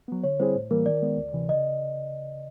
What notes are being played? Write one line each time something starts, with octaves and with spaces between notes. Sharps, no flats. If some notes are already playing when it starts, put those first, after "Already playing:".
F#3 B3
D3 C#5
G3 C4 E4 G#4 C5
A2
E3 G3 A#3 A#4
D#3 D5
G#3 B3
D2
C3 E3
C#3 D#5